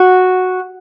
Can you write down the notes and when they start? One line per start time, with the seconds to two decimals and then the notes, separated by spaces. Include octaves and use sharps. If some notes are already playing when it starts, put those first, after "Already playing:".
Already playing: F#4